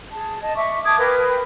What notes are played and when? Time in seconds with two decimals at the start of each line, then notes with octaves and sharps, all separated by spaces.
0.10 G#4 A5
0.41 D#5 A5
0.56 E5 C#6 D6
0.84 A5 D6 D#6 G#6
0.98 A#4 B4 F5 G5